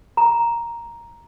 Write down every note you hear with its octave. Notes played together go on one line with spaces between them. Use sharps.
A#5